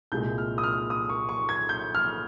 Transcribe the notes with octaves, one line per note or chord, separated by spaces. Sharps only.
C2 A#2 G#3 G6
F6
D#6
F6
D#6
C#6
C#6
G#6
G6
F6